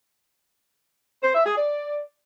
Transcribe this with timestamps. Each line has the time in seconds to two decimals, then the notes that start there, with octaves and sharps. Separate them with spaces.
1.23 C5
1.34 E5
1.45 G#4
1.57 D5